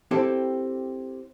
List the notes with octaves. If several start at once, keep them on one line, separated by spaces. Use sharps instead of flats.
C4 E4 G4 A4 E5